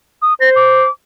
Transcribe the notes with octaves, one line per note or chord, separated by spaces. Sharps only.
D#6
C5 A#6
D6